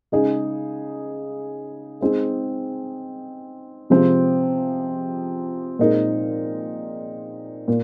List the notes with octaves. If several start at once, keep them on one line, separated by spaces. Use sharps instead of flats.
C#3 G#3 D#4 G#4
G#3 C4 D#4 G#4
C3 F3 G#3 C4
A#2 G#3 C4 D#4 A#4
A#2